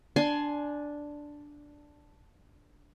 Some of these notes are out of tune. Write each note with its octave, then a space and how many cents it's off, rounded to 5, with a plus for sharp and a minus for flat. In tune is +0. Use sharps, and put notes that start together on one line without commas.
D4 +0 G#5 +20 C6 +0